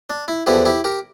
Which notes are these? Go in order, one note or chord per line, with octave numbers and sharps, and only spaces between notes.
D4
E4
E2 D3 F3 E4 G4
E4 G4
G4 A#4